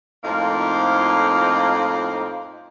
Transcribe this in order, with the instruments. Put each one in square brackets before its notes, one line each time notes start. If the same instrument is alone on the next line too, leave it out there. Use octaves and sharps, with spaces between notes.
[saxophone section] F2 A2 A#3 D#4 F4